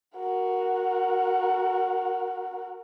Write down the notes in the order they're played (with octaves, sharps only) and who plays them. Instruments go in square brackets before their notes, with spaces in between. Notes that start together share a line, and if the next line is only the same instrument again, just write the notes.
[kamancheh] F#4 A#4